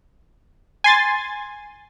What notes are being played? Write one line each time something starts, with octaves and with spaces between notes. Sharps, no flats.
G#5 C6 A6